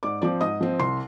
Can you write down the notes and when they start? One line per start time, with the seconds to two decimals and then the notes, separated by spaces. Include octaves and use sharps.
0.03 G#2 D5 D6
0.22 F3 C4 D5 D6
0.41 G#2 D#5 D#6
0.61 F3 C4
0.79 C2 C6 C7